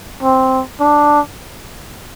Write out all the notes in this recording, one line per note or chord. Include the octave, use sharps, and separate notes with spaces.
C4
D4